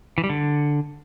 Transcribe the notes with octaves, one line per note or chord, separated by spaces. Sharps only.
E3
G3
D3